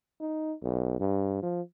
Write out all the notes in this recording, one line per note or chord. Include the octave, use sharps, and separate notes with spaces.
D#4
B1
G2
F3